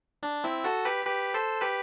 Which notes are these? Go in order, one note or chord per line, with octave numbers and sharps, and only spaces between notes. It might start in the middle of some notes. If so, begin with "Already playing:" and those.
D4
C4 E4
F#4 A4
G4 B4
G4 B4
A4 C5
G4 B4